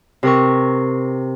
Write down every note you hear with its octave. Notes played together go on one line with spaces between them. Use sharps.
C3 A#4 C#6